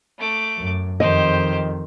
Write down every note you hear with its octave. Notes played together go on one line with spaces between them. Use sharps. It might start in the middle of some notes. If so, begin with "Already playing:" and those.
A3 D6
F#2
F2 D#3 G4 C5 D#5